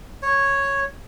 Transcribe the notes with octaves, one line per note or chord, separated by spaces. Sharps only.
C#5